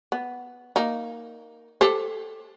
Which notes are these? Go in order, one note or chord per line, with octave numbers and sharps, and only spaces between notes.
B3
A#3 D#4
G4 A4 C5